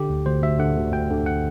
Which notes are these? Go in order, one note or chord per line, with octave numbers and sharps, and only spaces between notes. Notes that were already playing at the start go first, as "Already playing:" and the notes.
Already playing: D3 G4
D2
D2 C5
D2 E5
D3 F#5
D2
D2 G5
D3
F#5